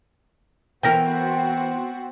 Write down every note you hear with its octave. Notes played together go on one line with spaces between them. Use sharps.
E3 B3 C4 F#4 A#4 G5 A#6